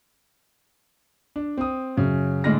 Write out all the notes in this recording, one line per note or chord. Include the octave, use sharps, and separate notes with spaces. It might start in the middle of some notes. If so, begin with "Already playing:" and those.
D4
C4 D#6
F#2 C#3
A2 D3 G#3 D4 F6 A#6